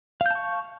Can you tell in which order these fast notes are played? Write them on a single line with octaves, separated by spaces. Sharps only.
F5 G6 A5 C#6